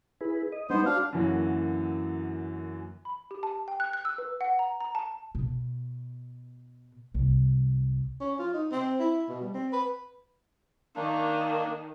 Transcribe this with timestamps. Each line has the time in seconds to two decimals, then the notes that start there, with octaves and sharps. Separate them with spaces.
0.21 E4 G#4 B4
0.52 D#5
0.70 G3 G#3 B3 D4 D#4 C5
0.86 D4 F#4 F5 F6
1.13 F#2 D3 E3 F#3 A#3 F#4
3.05 B5
3.31 G4
3.43 A5
3.68 G5
3.80 F#6
3.93 F#6
4.05 E6
4.18 B4
4.41 F#5
4.59 A#5
4.81 A#5
4.95 A5
5.35 B2
7.14 C2
8.20 C#4
8.39 F4
8.54 D#4
8.71 C4
8.99 E4
9.29 B2
9.42 G3
9.54 C4
9.72 B4
10.96 D#3 A#3 D4